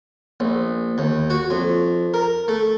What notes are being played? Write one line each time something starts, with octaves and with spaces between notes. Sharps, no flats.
A#1
D#2
F#4
F2
A#4
A3